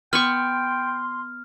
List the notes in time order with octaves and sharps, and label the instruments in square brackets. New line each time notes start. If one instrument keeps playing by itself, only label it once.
[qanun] B3 C#6 [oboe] G5 [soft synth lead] C6 [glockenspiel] F6